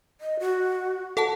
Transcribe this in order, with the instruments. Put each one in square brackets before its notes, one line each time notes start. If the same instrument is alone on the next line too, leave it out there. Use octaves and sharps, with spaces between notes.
[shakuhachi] D#5
F#4
[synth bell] A4 F#5 A5